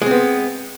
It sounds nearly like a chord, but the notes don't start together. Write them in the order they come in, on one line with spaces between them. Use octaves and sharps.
G#3 C4 B3